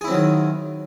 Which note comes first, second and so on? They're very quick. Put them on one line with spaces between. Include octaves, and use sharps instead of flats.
G#4 E4 C4 F#3 D#3